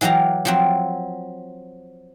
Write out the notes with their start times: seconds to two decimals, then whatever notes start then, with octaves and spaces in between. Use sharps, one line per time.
0.01 E3 F#3 G4 F5 A#5
0.45 F3 F#3 C4